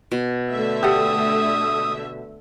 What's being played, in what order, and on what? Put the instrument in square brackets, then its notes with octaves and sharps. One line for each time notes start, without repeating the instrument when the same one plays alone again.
[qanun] B2
[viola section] D3 A3 E5
[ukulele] G4 A4 F#5 [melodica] D#6